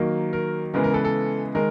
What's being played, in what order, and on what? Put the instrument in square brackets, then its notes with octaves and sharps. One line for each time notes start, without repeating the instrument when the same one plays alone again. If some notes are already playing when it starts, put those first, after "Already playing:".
Already playing: [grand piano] D#3 F#3 A#3
A#4
C#3 E3 G#3 B3 A#4
A#4
A4 B4
A4
D#3 G#3 A#4